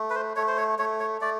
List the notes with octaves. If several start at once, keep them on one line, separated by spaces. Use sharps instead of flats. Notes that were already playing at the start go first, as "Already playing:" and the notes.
Already playing: A3
B4
C5
A3 C#5
C5
C#5
A3 C#5
C#5
A3 D5